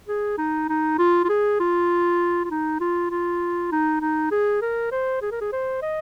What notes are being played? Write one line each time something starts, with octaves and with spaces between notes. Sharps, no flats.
G#4
D#4
D#4
F4
F4
G#4
F4
F4
D#4
F4
F4
D#4
D#4
G#4
A#4
C5
G#4
A#4
G#4
C5
D#5